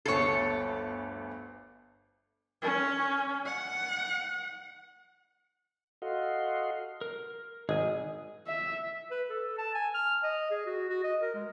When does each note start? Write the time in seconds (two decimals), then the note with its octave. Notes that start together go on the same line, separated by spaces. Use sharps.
0.06 G1 D2 A4 C#5 C7
2.62 C#4
3.46 F#5
6.02 F#4 A4 D#5 F5 F#5 C6
7.01 A#4
7.69 G#1 G#4 D#5 G#5
8.47 E5
9.11 B4
9.29 A4
9.58 A5
9.75 G#5
9.94 F6
10.24 D#5
10.51 G#4
10.66 F#4
10.90 F#4
11.04 D#5
11.22 A#4
11.35 G#3